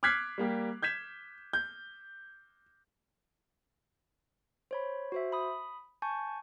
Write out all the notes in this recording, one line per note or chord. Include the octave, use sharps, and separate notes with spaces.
D6 F6 F#6 G#6 B6 C7
G3 A#3 G4
G6 G#6 B6 E7
G6
C5 C#5 B5
F#4 C5 E5
B5 D#6
G#5 A5 C#6 G6